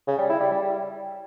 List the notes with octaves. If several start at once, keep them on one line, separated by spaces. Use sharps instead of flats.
C#3
G3
E4
G3
G3